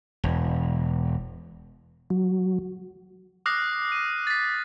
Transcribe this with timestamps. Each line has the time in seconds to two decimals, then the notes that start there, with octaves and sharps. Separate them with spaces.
0.24 E1
2.10 F#3
3.46 D6 D#6 F6 F#6 A#6 C7
3.92 D#7
4.27 A6 B6